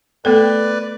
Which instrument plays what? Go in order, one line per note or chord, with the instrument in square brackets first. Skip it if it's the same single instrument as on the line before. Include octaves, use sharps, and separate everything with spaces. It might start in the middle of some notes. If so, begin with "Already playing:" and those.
[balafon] A3 B3 A4 [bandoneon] B4 D5